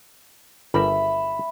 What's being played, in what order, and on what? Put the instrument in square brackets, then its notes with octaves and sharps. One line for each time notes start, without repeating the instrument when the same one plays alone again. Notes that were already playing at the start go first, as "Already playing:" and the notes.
[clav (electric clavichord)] G1 G3 A#4 [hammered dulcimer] E5 B5